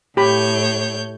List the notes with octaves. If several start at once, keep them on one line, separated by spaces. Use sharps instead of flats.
A2 G4 C#5 B5 G6